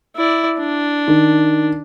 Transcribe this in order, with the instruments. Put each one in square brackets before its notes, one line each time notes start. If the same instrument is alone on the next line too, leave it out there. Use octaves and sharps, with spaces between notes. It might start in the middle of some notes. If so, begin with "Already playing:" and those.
[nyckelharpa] E4 D5
D4
[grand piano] D#3